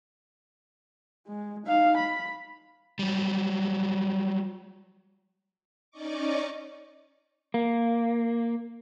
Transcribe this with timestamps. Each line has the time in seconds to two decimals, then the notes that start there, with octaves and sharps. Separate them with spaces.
1.28 G#3
1.66 D#4 F5
1.97 B5
2.99 F#3 G3
5.91 C#4 D#4 D5 D#5 C#6 D6
7.54 A#3